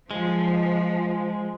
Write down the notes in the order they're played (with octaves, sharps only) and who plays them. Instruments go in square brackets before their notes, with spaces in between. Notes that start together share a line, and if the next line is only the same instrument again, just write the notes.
[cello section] F3 [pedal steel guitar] G#3